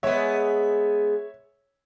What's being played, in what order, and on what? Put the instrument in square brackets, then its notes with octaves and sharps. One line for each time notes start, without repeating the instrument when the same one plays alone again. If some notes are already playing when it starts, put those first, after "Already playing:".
[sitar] G#3 B3 [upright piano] C#5 E5